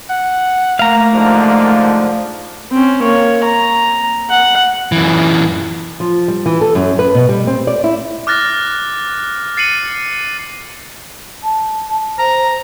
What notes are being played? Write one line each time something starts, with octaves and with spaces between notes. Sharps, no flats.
F#5
A3 A#3 F5 A#5
G#2 D3 F3
C4 C#4
A#3 C#5
A#5
F#5
F#2 E3
F3
G3
E3
A4
F#2
B4
B2
G3
C4
D5
E4
D6 F6 F#6 A6 A#6
A6 C7 C#7 D#7 F#7
A5
C5 A#5